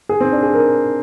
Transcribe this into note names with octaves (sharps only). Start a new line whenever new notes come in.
G#4
C4
D4
G#4
A#4